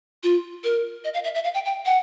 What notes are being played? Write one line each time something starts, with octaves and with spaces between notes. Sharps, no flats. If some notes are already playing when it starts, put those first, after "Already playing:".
F4
A#4
D#5
F5
E5
E5
F5
G5
G5
F#5